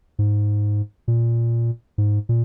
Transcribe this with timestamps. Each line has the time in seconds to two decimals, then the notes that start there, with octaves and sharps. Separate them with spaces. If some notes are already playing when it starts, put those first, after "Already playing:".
0.19 G#2
1.08 A#2
1.98 G#2
2.29 A#2